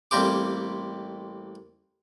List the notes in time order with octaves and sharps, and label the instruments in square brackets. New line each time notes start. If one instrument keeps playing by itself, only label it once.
[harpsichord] A1 G3 A#3 C4 G4 D6